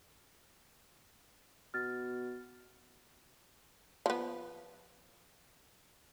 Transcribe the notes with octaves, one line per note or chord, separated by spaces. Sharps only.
B2 F6 A6
F3 B3